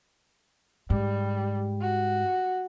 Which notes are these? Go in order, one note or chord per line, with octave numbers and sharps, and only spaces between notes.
G#2 G3
F#4